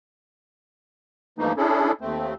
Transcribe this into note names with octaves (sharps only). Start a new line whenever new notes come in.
G2 E3 F3 A3 A#3 D#4
C#4 D4 E4 G#4 A4
D#2 A3 C4